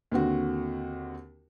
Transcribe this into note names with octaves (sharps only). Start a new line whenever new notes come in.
D#2 D3 C4 F#4